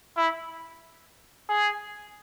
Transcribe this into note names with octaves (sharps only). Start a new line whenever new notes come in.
E4
G#4